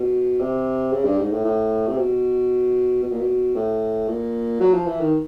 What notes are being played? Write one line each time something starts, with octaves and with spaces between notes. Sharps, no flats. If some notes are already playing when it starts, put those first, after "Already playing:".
Already playing: B2
C3
C#3
G2
G#2
A2
A2
C3
B2
B2
A#2
B2
A2
A#2
F#3
F3
E3
D#3